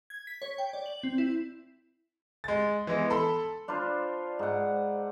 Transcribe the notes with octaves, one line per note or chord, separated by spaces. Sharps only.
G#6
B6
C#5
G5
D5
F#7
C4
E4
G#3 A6
E3 G#3 B3
A4 B5 C6
D4 F4 B4 C5
G#2 F#5